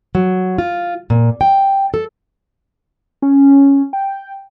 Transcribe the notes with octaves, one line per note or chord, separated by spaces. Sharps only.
F#3
F4
A#2
G5
A4
C#4
G5